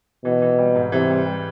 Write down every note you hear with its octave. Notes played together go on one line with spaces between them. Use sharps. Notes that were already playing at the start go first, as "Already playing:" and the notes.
B2 E3
E3
G3
G#2
C3 E3
G3
G3